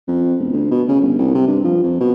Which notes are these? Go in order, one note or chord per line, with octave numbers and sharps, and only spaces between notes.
F2
E1
D2
B2
C#3
G1
C2
C3
G2
F3
F2
B2